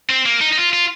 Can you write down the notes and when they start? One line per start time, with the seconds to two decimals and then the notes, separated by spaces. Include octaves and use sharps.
0.10 C4
0.26 A#3
0.41 D#4
0.52 D#4
0.57 F4
0.73 F4